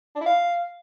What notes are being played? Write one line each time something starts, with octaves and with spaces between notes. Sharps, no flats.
D4
E4
F5